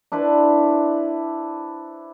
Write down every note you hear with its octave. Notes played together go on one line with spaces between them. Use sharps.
D4 E4 B4 C5